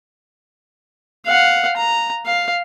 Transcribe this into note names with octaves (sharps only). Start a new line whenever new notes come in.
F5 F#5
A#5
F5